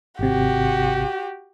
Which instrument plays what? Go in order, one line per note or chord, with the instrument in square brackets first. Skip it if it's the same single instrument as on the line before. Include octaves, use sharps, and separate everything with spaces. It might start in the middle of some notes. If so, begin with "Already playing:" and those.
[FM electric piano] G#1 C3 [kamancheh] F#4 G4